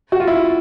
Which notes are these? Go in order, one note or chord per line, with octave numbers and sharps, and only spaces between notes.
F#4
F4
E4